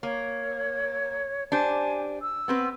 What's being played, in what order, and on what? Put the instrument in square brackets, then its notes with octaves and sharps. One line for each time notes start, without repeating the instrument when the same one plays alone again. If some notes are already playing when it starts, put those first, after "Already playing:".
[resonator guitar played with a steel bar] A#3 [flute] C#5
[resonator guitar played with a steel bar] D4 G4 C5 [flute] G#5
[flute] E6
[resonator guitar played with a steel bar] B3 C4 B4